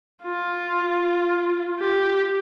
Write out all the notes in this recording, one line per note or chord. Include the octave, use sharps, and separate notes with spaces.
F4
G4